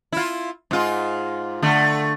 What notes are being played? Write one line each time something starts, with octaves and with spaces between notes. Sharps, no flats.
E4 F4
G#2 F4
D3 A3